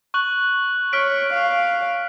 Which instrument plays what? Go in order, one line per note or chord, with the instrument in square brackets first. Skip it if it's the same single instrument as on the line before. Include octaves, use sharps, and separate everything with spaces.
[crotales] C#6 F#6 F#7
[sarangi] C#5 [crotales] F6 B6 D7
[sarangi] F5